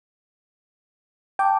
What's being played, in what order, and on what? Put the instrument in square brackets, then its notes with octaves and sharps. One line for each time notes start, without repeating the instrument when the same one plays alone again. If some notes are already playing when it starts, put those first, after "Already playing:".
[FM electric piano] G5 [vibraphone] A5 D6